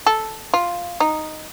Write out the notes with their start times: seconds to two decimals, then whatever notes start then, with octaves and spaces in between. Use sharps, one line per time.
0.06 A4
0.54 F4
1.00 D#4